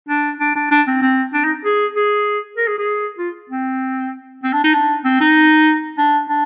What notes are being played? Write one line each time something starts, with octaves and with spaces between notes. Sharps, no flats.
D4
D4
D4
D4
C4
C4
D4
D#4
G#4
G#4
A#4
G#4
G#4
F4
C4
C4
D4
D#4
D4
C4
D#4
D4
D4